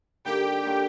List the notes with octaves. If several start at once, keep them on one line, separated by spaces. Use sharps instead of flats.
D3 G3 A#3 D#4 G4 G5
D3 G3 A#3 C#4